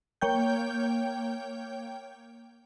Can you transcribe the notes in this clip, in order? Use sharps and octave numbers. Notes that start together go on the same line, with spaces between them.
A#3 C#5 G5 G6